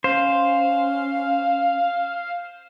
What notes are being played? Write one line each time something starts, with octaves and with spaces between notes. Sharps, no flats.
C#4 C5 F5